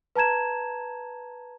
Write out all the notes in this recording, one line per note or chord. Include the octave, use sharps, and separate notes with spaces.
B4 A5 A#5 G#6 E7